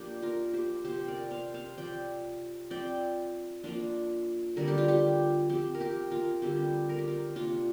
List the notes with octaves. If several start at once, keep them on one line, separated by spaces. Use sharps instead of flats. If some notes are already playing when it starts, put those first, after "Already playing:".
Already playing: F3 A#3 D4 G4
F4 A#4
G4 C5
C3 F3 C4 G4 C5
A#4 D5
C5 F5
C5 F5
F3 C4 D5 G5
F3 C4 D5 G5
F3 A#3 D4 F4
D3 G3 D4 A#4
G4
F4
G4
F3 C4 G4
A#4
G4
F4 A#4
D3 G3 C4 G4
A#4
G4
F4 A#4
C3 A#3 D4 F4